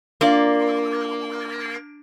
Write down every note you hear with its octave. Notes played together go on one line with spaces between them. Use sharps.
A#3 D4 F4 D5